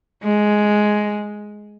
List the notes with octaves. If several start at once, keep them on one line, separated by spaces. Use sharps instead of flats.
G#3